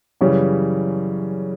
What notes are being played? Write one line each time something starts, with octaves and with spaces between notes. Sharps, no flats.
F#2 C#3 E3 G3